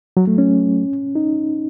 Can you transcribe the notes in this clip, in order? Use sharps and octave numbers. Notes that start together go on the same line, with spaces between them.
F#3
A3
C#4
D#4